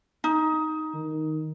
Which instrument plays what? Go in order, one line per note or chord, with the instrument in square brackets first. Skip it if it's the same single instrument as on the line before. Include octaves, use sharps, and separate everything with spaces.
[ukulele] D#4
[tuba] D#3